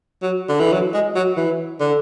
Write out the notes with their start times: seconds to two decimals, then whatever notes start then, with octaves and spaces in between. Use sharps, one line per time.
0.22 F#3
0.48 D3
0.60 E3
0.72 F#3
0.94 G#3
1.15 F#3
1.37 E3
1.80 D3